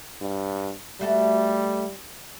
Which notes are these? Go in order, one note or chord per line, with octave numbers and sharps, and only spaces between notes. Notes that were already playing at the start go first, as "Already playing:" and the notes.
G2
G3 A3 F#4 A4